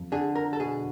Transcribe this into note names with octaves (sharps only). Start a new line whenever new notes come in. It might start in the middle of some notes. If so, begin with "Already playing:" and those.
Already playing: F2
D3 G#4
A#4
A4
B2 G#4